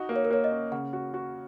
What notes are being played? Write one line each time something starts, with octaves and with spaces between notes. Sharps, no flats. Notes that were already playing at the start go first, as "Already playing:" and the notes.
Already playing: D#4 F#4
A#3
C#5
A#4
A#3 C#5
D#5
C#4
C#3 F#5
F#4
F#4